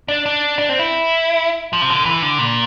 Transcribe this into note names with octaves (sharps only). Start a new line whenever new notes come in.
D4
D4
D4
C4
E4
F3
C3
D3
E3
D3
A#2